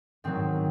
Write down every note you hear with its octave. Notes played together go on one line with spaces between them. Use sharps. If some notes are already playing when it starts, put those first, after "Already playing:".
G#2 D#3 F#3 C4